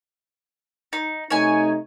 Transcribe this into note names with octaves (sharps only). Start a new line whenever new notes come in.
D#4
C3 A3 D#4 C#5 G#5